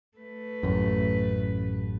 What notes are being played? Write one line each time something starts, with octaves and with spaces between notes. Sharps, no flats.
A3 B4
A1 F#2